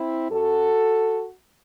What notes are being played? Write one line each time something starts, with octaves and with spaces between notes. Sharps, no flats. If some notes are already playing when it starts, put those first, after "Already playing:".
Already playing: C4 E4
F#2 F#3 F#4 A4